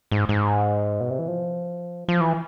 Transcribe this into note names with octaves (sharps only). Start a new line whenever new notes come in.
G#2
G#2
B2
C3
E3
F3
F3
E3